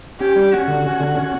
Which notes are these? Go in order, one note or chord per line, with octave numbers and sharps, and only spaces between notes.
C#4 G4
G3
C#4 F#4
D3
C#4
D3
C#4